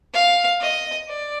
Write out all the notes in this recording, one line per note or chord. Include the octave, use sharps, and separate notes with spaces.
F5
D#5
D5